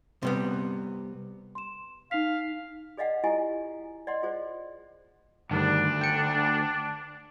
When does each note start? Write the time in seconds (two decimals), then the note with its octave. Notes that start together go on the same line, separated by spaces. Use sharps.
0.23 C3 G3 B3
1.55 C6 E7
2.11 D#4 F5 B6
2.97 G#4 D5 D#5 F5 F#5
3.24 E4 F4 G4 A4 D#5 G#5
4.07 D5 D#5 F#5 C6
4.23 F4 G#4 C5 D5
5.51 D2 G2 D3 D#3 G3 D4
6.01 G5 C#7